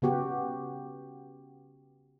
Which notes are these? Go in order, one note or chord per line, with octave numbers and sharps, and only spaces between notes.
C#3 B3 F#4 G4